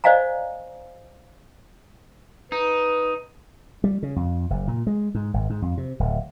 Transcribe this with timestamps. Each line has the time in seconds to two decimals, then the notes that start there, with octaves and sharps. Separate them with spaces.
0.04 C5 D5 D#5 F5 G#5 A#5
2.52 D#4 B4
3.84 G3
4.03 C#3
4.16 F2
4.50 F#1
4.68 A#2
4.87 G#3
5.15 G#2
5.34 G#1
5.50 G#2
5.62 F2
5.77 C3
6.00 D1